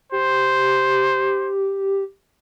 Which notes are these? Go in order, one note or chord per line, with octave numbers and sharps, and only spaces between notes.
G4 C5